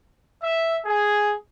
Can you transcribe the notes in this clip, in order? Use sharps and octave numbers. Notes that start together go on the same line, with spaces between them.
E5
G#4